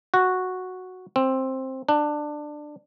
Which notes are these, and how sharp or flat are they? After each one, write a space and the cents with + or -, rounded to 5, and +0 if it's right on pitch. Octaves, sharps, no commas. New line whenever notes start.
F#4 -5
C4 +10
D4 +15